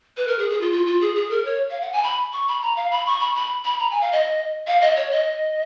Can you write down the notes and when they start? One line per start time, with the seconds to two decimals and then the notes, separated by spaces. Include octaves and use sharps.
0.17 B4
0.27 A#4
0.39 G#4
0.50 G#4
0.61 F4
0.72 F4
0.86 F4
1.01 G#4
1.16 G#4
1.30 A#4
1.45 C#5
1.70 F5
1.81 F#5
1.92 G#5
2.03 B5
2.33 C#6
2.48 B5
2.62 A#5
2.76 F5
2.91 B5
3.06 C#6
3.20 B5
3.35 B5
3.65 B5
3.79 A#5
3.90 G#5
4.01 F5
4.12 D#5
4.67 F5
4.81 D#5
4.96 C#5
5.11 D#5